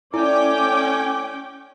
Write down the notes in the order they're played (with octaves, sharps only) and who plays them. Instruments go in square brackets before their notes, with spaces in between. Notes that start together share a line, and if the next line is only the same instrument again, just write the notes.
[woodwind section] A3 G#5 D6 [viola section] C#4 G5 [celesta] E4 [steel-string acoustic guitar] D5